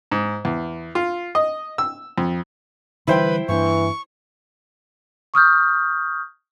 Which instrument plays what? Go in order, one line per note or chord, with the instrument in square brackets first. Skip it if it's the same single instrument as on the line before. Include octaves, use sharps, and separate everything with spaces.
[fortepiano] G#2
E2
F4
D#5
E6
F2
[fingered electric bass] D3 E3 G3 [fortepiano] E4 C5 G5 [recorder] B4
[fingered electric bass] G2 A#3 D4 [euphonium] E3 [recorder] C#6
[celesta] C#6 D#6 F6 G6